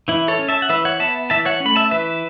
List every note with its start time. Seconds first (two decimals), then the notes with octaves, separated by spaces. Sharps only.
0.08 E3 E4
0.28 A4 C#5
0.39 C#4
0.49 E5 A5
0.62 F#5
0.69 E3 B4 E5
0.85 C#5 F#5
1.00 B3 E5 A5
1.30 E3 E5 A5
1.45 C#5 F#5
1.60 C#4
1.65 A3 B5
1.76 E5 A5
1.91 E3 B4 E5